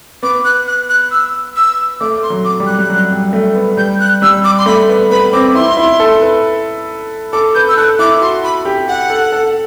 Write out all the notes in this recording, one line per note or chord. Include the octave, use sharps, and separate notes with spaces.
B3 D6
F#6
F#6
F#6
E6
E6
A3 D6
C6
F#3
D6
G3
F#6
G3
F#3
G3
A3
B3
G3 G6
F#6
G3 E6
D6
C6
A3 B5
B3
B3 B5
C4 D6
E4 C6
E4
A4
B4
A4 D6
B4 G6
E6
A4 F#6
E4 D6
F#4 C6
B5
G4
F#5
A4
A4